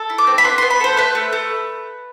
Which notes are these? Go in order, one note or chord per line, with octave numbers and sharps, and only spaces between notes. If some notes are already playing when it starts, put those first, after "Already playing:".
Already playing: A4
E4
D6
C4
B5
B3 C6
B3 C6
B5
A4 C5
A3 B4
A3
A3